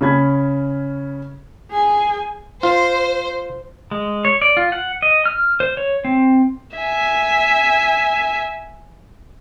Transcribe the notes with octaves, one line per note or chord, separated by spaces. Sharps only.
C#3 C#4 B5 G#6
G#4 G#5
F4 C5
G#3
C#5
D5
F4
F#5
D#5
F6
C5
C#5
C4
E5 G#5